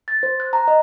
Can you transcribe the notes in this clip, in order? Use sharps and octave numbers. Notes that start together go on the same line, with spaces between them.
A6
C5
F#6
A#5
D#5